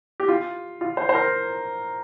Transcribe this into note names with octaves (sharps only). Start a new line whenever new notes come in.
G4
F4
F4
C5
C5
A#4